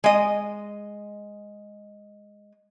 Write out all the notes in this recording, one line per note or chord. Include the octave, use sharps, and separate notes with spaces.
G#3 D#5